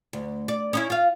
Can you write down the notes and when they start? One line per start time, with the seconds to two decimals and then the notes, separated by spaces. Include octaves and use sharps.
0.13 D2
0.48 D5
0.73 C#4 D#4 E4
0.90 F4 F5